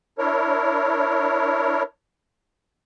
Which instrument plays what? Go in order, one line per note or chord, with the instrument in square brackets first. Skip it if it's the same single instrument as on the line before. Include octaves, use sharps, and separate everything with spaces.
[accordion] D4 E4 A#4 C#5